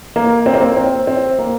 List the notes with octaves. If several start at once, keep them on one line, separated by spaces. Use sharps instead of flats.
A#3
C4
A#3
C4
C4
C4
A#3